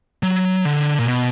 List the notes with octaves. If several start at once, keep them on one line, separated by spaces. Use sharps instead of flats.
F#3
D3
A#2
B2